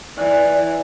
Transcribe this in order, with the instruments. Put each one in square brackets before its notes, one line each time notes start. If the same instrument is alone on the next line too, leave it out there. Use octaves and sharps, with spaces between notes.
[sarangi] E3 [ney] D5